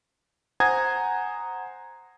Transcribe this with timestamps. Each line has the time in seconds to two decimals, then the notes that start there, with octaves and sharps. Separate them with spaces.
0.60 C5 F#5 G#5 A#5 D#6 G#6